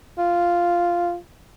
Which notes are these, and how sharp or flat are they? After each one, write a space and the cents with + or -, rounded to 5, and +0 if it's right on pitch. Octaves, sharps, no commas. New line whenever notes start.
F4 -5